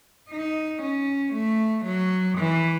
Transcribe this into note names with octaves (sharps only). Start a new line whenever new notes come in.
D#4
C#4
A3
F#3
E3